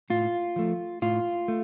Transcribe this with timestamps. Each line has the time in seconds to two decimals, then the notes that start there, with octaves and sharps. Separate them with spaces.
0.10 A2 F4
0.56 F3 A3
1.02 A2 F4
1.48 A3